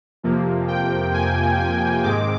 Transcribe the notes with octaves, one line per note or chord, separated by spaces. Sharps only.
F2 C3 F3 A#3
G5
G#5
G#5
G#2 D#3 G#3 C4 D6